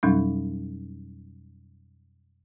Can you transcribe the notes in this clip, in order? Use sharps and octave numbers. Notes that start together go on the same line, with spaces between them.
F2 B2 F#3 G3 C#4 D#4